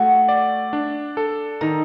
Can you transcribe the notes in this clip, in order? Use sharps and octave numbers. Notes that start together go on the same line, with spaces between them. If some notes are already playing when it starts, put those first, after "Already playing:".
Already playing: A3 F#4
D5
D4
A4
D#3 D#4